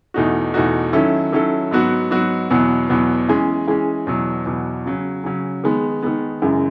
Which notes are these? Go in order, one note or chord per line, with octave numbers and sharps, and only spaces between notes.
E2 B2 A3 D#4 F#4
E2 B2 A3 D#4 F#4
D#3 F#3 C#4 E4 A4
D#3 F#3 C#4 E4 A4
G#2 F#3 B3 F#4
G#2 F#3 B3 F#4
E2 B2 F#3 B3
E2 B2 F#3 B3
E3 G#3 C#4 G#4
E3 G#3 C#4 G#4
E2 B2 F#3
E2 B2 F#3
C#3 F#3 C#4
C#3 F#3 C#4
D#3 G#3 B3
D#3 G#3 B3
F#2 C#3 E3 G#3